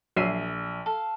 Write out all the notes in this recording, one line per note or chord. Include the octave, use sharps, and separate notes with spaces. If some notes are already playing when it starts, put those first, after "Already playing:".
A#1 F#3 E5 C7 D#7
A4 F5